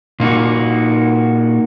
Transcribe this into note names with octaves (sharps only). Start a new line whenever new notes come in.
A#2 A#3 D#4 F#4